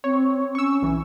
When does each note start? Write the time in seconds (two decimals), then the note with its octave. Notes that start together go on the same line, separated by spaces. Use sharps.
0.04 C4 C#5
0.55 C#4 C#6 E6
0.82 B1 E3